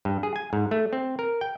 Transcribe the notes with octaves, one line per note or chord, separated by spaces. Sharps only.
G2
G#4
G#5
G#2
A3
C4
A#4
G5